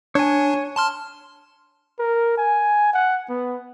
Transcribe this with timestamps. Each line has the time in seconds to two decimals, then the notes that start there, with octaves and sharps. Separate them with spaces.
0.15 D4 C#5 G#5
0.76 A5 C6 F6
1.99 A#4
2.37 G#5
2.93 F#5
3.29 B3